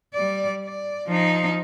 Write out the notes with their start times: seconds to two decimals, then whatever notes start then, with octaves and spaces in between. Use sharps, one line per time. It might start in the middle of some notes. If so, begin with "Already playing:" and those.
0.14 G3 D5
0.64 D5
1.08 F3 D#4